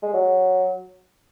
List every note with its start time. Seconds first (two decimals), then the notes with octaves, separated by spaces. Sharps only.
0.03 G#3
0.13 F#3